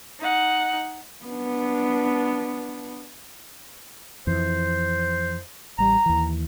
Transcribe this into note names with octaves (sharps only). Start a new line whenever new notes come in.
D#4 F#5
B3 D4
F2 E3 C5
A1 G3 A#5
D#2 E3